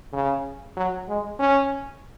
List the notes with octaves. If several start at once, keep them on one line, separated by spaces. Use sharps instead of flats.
C#3
F#3
G#3
C#4